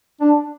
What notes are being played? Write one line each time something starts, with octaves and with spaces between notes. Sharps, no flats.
D4